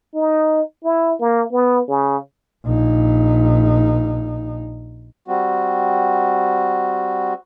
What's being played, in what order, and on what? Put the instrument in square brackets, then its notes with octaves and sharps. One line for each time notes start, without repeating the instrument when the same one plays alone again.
[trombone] D#4
E4
A#3
B3
C#3
[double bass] A#1 D#4
[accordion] G3 C4 F#4